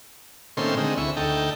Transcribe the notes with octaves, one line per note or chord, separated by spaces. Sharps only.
A#2 D#3 A3 C4 C#4 C6
D3 G#3 C4 D#4
D2 E4 C#6
D2 D#4 A4 G5